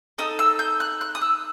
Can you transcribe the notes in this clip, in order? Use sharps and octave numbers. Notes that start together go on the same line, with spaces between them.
D#4 A4 D#6
E6
G6
F#6
F#6
D#6
E6